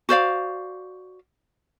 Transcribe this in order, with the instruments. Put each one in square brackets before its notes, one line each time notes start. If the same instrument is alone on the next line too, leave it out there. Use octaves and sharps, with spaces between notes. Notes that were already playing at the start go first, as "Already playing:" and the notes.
[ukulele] F#4 C5 D5 F5